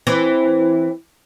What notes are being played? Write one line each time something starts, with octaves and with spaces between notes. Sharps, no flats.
E3 C4